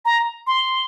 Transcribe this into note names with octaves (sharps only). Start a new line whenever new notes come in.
A#5
C6